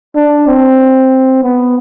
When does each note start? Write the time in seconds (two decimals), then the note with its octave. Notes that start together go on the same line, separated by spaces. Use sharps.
0.15 D4
0.47 C4
1.43 B3